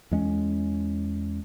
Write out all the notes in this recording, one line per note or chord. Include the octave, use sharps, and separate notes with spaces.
E2 G#3 C#4